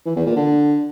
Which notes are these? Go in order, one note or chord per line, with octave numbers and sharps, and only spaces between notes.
E3
E2
A#2
D3